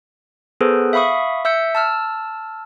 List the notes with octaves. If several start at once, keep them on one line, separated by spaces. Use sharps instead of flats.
B3 G#4 A4 B4 C5
E5 F5 B5 C#6 D#6
E5 E6 G6 C#7
A5 E6 F6